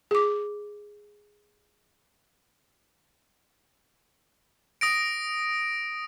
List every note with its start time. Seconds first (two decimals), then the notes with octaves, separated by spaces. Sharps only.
0.11 G#4 D6
4.81 D#6 A#6 D7